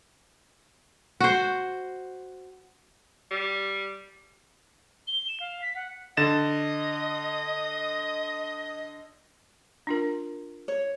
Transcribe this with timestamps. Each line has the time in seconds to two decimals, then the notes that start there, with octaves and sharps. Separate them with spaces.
1.20 F#4 C5
3.31 G3
5.07 G7
5.29 E7
5.40 F5
5.62 B6
5.75 F#5
6.17 D3 D#5 A6 E7
9.87 D4 F4 A#4
10.68 C#5